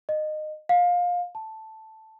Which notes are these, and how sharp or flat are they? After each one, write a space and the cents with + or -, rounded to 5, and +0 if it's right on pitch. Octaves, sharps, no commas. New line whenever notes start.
D#5 -20
F5 +20
A5 +0